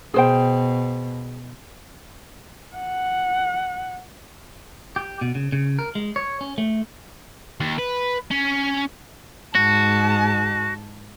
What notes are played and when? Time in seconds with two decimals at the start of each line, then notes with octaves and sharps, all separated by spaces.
0.14 B2 G#4 C5 G5
2.76 F#5
4.96 G4
5.21 B2
5.35 C#3
5.52 C#3
5.79 A#4
5.95 G#3
6.16 C#5
6.41 C#4
6.58 A3
7.61 D#2
7.79 B4
8.31 C#4
9.55 G#2 F#4 A5